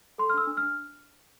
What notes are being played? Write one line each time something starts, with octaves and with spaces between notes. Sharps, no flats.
A4 C6
F6
D4 E6
D4
F6
D4